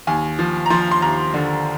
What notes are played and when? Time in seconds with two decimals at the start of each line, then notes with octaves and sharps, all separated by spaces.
0.07 D#2 G#5
0.39 F3
0.66 A#5
0.70 F3 C6
0.91 C6
1.02 D#2 A#5
1.34 D3